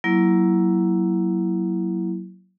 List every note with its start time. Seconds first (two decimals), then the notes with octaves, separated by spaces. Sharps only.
0.04 F#3 A#3 E4